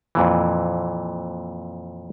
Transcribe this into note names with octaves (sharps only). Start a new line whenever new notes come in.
F2 A#2 E3